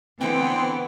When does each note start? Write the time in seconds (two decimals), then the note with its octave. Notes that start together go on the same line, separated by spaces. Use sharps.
0.20 D3 E3 B3 C4 G5 C6